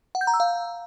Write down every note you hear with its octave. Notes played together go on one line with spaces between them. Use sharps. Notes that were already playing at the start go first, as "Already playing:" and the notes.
F#5
G6
A#5
E6
F5